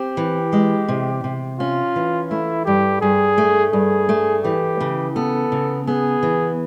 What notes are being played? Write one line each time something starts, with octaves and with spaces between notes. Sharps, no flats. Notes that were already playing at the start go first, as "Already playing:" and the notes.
Already playing: C4 G4
E3
G#3
C3
C3
C#4 F4
E3
A3 E4
G2 G4
G2 G#4
A3
G2 G#4
A3
E3 G4
C#3
B3 A4
C#3
B3 G#4
E3